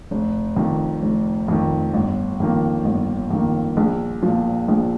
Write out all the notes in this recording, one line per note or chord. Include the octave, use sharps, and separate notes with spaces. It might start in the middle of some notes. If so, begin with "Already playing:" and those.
F1
F2 D#3
F1
F2 D#3
G1
F2 D#3 A#3
G1
F2 D#3 A#3
A#1
A#2 F3
A#1